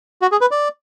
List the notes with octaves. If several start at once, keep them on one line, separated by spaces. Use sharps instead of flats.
F#4
G#4
B4
D5